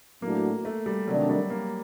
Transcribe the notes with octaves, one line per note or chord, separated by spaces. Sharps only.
A2 F#3 A3 A#3 D4 F#4
A3
G3
C3 D#3 F#3 A3 D4
G3
A#3